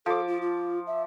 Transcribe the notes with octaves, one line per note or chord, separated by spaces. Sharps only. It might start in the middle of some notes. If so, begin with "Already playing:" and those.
F3 A4 D6
F4
F4
E5